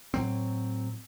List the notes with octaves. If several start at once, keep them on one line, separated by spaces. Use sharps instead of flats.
A2 F#3 C4